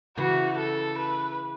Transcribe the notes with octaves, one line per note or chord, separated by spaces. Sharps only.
C#3 E3 F#4
A4
B4